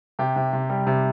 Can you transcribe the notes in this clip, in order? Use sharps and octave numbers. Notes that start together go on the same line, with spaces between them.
C3 G4
C3
C3
G3
C3